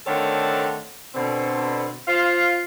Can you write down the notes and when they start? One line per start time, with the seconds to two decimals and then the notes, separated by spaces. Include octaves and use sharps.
0.07 D3 D#3 A3 C4 A4 C#5
1.15 B2 D3 C4
2.08 F4 C5 F5